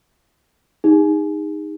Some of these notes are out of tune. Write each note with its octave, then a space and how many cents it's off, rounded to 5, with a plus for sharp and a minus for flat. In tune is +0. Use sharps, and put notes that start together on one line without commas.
D#4 +0 G#4 -35